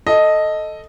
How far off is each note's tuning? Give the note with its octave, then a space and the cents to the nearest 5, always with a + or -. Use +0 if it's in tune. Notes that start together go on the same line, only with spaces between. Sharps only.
A4 +0 D#5 +0